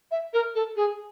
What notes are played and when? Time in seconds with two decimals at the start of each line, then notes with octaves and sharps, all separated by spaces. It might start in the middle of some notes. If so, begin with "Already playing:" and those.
0.11 E5
0.33 A#4
0.55 A4
0.76 G#4